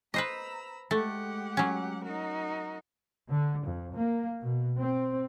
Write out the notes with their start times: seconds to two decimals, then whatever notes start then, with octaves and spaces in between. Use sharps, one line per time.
0.14 B4 C5 D#5 A#5 B5 E6
0.91 G#3 A3 G4 F#5
1.57 F#3 C#4
2.04 D#4 F#4 A#4
3.29 D3
3.65 F2
3.95 A#3
4.43 B2
4.80 C4